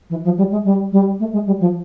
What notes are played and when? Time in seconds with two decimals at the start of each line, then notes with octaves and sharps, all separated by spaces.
0.10 E3
0.24 F3
0.38 G3
0.51 G#3
0.64 G3
0.92 G3
1.19 A3
1.33 G#3
1.46 G3
1.60 F3